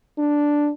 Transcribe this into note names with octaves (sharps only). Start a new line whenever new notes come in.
D4